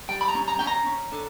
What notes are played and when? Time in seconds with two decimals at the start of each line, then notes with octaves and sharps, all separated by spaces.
0.09 G3 G5
0.21 B5
0.28 A#5
0.35 C#4
0.48 A#5
0.59 C#4 G5
0.67 A#5
0.87 C#4
1.12 D3